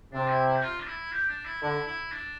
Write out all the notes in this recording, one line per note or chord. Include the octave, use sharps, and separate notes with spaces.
C3 D4
E4
E4
G4
F4
D4
E4
G4
D4
E4
D3 E4
E4
D4